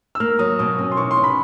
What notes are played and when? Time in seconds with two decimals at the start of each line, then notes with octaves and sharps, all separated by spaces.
0.15 E6
0.20 A#3 F6
0.39 F#3 D#6
0.59 B2 D#6
0.78 C#4
0.92 C6
0.97 E3 C#6
1.11 C6
1.17 C#4
1.24 B5